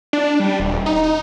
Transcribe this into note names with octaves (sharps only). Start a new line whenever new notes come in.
D4
G3
D#1
D#4
D#4